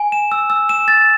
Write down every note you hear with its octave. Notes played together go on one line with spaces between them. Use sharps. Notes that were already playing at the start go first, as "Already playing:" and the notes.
Already playing: G#5
E7
E6
E6
E7
A6